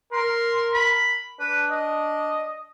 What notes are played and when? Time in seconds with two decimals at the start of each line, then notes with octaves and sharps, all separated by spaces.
0.13 A#4 C6
0.74 B5
1.40 D4 B4
1.70 D#5